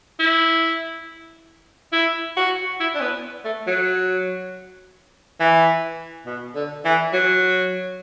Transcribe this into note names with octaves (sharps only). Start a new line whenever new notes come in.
E4
E4
F#4
E4
D4
B3
A3
F#3
E3
B2
D3
E3
F#3